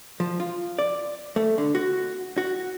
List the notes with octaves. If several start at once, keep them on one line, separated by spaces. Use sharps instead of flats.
F3
F4
D5
A3
D3
F#4
F#4